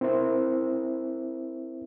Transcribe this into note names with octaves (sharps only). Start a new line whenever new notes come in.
C4 E4 A#4 C5 E5